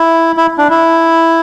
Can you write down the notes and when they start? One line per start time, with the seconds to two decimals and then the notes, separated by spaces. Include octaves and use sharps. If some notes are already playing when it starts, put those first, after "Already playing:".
Already playing: E4
0.37 E4
0.58 D4
0.70 E4